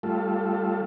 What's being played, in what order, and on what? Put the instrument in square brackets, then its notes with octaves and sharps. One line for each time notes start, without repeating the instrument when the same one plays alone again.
[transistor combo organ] G3 A3 F4 A4